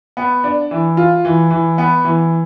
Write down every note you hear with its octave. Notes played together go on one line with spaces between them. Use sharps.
B3
D4
E3
F4
E3
E3
B3
E3